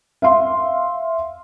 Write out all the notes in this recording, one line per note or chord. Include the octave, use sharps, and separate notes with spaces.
E5 F5 C6